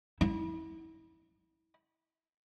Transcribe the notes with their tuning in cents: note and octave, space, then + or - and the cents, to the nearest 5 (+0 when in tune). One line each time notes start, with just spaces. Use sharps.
E4 -30